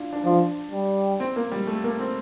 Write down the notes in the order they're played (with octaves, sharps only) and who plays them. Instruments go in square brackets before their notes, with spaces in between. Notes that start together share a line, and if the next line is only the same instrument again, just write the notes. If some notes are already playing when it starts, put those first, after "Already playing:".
Already playing: [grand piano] D4 E4 F4
D4
[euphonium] F3 [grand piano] D4
[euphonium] G3
[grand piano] C4
A#3
G3
A3
A#3
C4